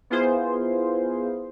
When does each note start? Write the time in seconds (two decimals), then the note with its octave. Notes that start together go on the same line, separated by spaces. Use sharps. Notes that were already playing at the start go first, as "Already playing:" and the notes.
0.10 B3 E4 F4 G#4 C5